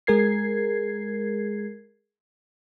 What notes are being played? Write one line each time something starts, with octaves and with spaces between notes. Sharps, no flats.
G#3 G#4 A#4 G#6 C7